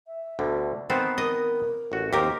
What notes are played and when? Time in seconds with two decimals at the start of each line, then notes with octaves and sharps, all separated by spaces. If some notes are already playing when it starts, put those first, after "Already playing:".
0.07 E5
0.39 D2 B2 D3
0.90 D#3 B3 C4 A5
1.18 A#4 D#5
1.92 A1 F#4
2.13 D#2 D#3 C4 G4 A#4